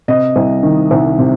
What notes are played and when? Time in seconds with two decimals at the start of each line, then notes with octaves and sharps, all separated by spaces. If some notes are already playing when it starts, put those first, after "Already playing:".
0.08 C3 D#5
0.36 C2
0.63 D#3
0.91 C2
1.18 C3